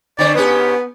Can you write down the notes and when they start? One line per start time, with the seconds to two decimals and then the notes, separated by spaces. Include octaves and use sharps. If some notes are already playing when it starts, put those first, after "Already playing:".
0.19 D3 C4 C#5 D5
0.35 G#2 B3 C#4 G4